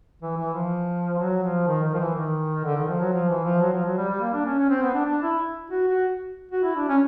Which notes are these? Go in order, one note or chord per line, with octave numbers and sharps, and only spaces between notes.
E3
E3
F3
F#3
F3
D#3
D#3
F3
E3
D#3
D3
D#3
F3
F#3
F3
E3
F3
F#3
F3
F#3
G3
G3
A#3
D4
C#4
C#4
C4
B3
D4
D4
E4
F#4
F#4
F#4
E4
D4
C#4